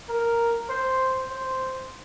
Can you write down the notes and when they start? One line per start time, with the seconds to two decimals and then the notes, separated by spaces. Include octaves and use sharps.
0.09 A#4
0.69 C5
1.30 C5